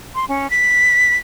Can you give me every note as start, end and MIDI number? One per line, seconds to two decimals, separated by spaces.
0.15 0.25 84
0.28 0.50 61
0.50 1.17 95